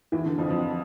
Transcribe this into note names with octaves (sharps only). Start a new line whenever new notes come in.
E2 E3
D3
F2 F3
F2 F3